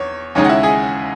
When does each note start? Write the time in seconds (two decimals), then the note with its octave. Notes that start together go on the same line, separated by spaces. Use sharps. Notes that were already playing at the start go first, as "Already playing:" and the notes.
Already playing: E2 C#5
0.35 D#2 C#3 G#3 D#4 C#5
0.45 F#5
0.49 E4 E5
0.63 G#4 G#5